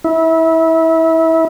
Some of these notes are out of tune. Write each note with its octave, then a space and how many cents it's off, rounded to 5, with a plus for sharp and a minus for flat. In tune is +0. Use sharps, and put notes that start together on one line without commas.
E4 -25